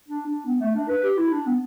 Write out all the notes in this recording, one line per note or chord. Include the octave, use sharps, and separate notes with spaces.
D4
D4
B3
A3
D4
B4
G4
E4
D4
B3